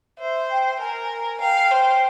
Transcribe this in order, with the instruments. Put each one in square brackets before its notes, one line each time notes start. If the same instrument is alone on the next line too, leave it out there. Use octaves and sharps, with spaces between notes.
[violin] C5 [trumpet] E5
[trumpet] G5
[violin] A#4 [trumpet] G#5
[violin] F5 [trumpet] G5
[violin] C5